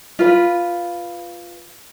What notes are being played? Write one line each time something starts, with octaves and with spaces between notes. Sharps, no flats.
F4 B4